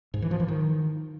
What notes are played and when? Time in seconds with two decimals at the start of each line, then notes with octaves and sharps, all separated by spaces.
0.14 G#2
0.22 E3
0.31 F3
0.40 E3
0.48 D#3